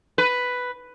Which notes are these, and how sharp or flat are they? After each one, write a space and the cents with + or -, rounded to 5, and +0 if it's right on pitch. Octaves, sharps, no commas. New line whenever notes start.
B4 +5